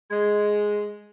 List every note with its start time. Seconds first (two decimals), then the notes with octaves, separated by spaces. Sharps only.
0.09 G#3